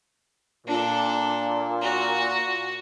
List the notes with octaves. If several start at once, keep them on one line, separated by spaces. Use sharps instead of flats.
A#2 D4 A4
F#4